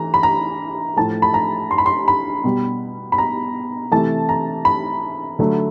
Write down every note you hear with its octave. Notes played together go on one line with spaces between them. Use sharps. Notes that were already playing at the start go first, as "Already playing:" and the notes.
Already playing: E3 A3 A#5
B5
A#5
A2 F3 A3 A5
B5
A#5
C6
B5
C6
B5
B2 G3
B5
A#5
C3 E3 A3 A5
A#5
B5
D3 F#3 A3